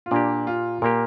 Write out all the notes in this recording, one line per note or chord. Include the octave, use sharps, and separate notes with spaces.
F4
A#2 A#3 D4 G4
F4
A#2 A#3 G4 A#4